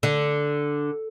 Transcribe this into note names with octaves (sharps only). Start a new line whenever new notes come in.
D3